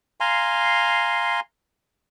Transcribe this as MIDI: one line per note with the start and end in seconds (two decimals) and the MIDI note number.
0.20 1.40 77
0.20 1.40 80
0.20 1.40 82
0.20 1.40 84